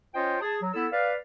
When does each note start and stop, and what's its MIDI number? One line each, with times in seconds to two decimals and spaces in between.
0.14 0.36 61
0.14 0.36 65
0.14 0.36 72
0.14 0.36 73
0.14 0.36 75
0.14 0.36 79
0.41 0.57 68
0.41 0.57 81
0.62 0.70 54
0.74 0.86 59
0.74 0.86 64
0.74 0.86 69
0.74 0.86 88
0.92 1.14 71
0.92 1.14 74
0.92 1.14 77